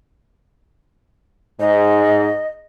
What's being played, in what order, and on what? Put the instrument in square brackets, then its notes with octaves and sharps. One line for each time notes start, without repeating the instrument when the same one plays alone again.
[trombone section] G#2 [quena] D#5